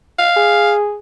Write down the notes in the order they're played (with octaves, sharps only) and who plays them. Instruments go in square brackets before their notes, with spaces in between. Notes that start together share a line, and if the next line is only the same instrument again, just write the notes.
[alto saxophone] F5
[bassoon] G#4